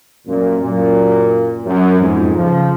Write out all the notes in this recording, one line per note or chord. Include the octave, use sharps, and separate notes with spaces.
F#2 A#2
F#2 A#2
F#2
F2 G#2
C#3 F3